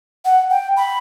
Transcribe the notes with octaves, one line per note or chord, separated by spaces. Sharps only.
F#5
G5
B5